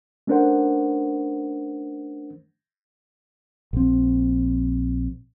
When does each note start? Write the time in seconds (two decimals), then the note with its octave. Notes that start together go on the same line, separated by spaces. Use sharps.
0.27 A3 C#4 D4 A#4 C5 F#5
3.73 A#1 C4